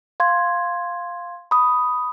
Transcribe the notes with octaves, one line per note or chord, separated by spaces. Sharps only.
F5 C6 G#6
B5 D#6